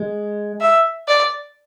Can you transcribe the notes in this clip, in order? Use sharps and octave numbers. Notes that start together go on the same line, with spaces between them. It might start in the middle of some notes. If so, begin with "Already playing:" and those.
Already playing: G#3
E5
D5